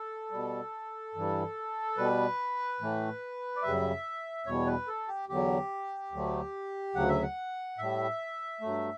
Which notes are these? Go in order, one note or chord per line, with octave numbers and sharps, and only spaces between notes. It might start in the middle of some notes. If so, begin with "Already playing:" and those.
Already playing: A4
B2 G3
G2 E3 G3
B2 G3 B4
A2 E3 A3
D5
F#2 C#3 G3 E5
E2 B2 G3 C#5
B4
A4
G4
E2 D3 F#3 G4
D2 D3 F#3 A3
D2 C#3 F#3 F#5
E5
F#5
A2 G3 E5
G2 F#3 A3